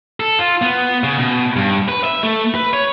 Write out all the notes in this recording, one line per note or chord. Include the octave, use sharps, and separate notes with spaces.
A4
F4
B3
C#3
B2
G2
B4
E5
A3
B4
C#5